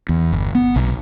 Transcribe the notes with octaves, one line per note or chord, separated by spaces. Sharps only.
E2
G1
B3
B1